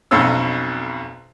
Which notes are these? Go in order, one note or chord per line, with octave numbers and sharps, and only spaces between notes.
B1 F2 B2 C#4 E6